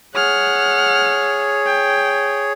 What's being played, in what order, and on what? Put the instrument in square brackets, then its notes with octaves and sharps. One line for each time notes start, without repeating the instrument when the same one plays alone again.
[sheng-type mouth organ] G#4 C#5 [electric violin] F#5 F6
[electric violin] G5